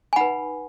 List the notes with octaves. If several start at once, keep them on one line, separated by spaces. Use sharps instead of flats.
G#5
D#4 B4 F#5 B5